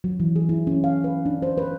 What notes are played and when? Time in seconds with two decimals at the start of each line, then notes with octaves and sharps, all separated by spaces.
0.04 F#3
0.20 E3
0.36 G#4
0.49 E4
0.67 C#4
0.84 F5
1.04 B4
1.26 D4
1.42 C5
1.58 B4